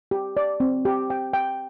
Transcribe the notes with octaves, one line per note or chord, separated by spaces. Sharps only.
G4
D5
C4
G4
G5
G5